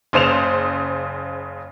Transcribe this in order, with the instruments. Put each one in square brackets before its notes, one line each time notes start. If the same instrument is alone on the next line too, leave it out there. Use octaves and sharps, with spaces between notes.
[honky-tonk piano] F#1 C#3 C5 E7 F7